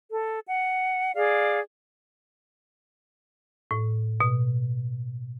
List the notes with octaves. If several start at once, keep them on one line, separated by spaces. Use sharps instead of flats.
A4
F#5
G#4 D5 F5
A2
B2